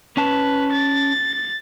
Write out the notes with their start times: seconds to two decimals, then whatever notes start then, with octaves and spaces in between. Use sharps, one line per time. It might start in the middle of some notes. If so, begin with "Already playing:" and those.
0.17 C#4 B4 A5
0.72 A6